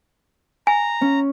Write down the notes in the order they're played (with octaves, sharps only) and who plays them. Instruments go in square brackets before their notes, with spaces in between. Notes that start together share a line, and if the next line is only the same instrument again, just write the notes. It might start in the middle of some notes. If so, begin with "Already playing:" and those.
[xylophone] G#5 [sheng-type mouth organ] A#5
[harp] C#4